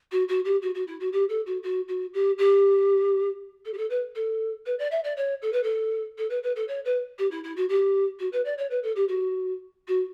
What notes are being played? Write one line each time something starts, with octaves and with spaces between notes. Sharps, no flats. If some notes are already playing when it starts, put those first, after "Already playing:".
F#4
F#4
G4
F#4
F#4
E4
F#4
G4
A4
F#4
F#4
F#4
G4
G4
A4
G4
A4
B4
A4
B4
D5
E5
D5
C#5
A4
B4
A4
A4
B4
B4
A4
C#5
B4
G4
E4
E4
F#4
G4
F#4
B4
D5
C#5
B4
A4
G4
F#4
F#4